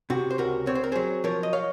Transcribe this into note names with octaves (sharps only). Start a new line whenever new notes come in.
C3 F#4
C5
C#2 F#4 A#4
C4 C#5
C5
A#4
F#3 G#4 C5
F3 A#4 C#5
D#5
C#5 F5